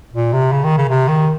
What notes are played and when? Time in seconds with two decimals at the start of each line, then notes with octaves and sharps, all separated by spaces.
0.14 A#2
0.33 C3
0.52 C#3
0.64 D#3
0.78 C#3
0.89 C3
1.09 D#3